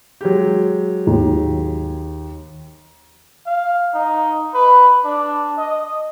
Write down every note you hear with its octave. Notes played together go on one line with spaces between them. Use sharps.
F#3 G#3 G4
D#2
F5
D#4
B4
D4
D#5